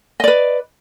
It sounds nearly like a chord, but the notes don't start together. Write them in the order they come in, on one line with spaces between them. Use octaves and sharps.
D#5 D5 B4